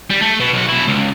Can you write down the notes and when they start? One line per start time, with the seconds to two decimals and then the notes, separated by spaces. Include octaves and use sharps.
0.10 G3
0.21 A3
0.40 B2
0.53 B1 F#4
0.69 B2 E4
0.88 C#2